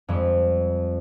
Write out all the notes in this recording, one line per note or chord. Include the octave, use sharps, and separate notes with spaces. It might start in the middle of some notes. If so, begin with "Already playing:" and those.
F2 G3 G#3